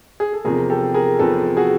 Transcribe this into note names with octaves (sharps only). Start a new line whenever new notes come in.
G#4
A4
E2 C3 F3 G#4 A#4
G4 A4
G#4 A#4
E2 C3 F3 A4 B4
F#4 G#4